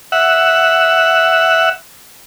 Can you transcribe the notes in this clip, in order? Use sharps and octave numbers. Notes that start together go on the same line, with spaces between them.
E5 F#5